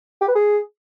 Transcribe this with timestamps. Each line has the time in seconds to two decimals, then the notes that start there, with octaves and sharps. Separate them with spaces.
0.21 G4
0.28 B4
0.35 G#4